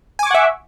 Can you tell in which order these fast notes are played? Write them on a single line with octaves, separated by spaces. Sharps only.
G#5 D6 C#6 F#5 E5